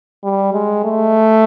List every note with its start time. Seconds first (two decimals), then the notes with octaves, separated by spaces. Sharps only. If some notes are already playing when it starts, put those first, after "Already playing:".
0.24 G3
0.53 G#3
0.85 A3